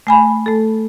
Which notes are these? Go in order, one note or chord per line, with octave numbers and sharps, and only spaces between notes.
A3 G#5 B5
A3 A4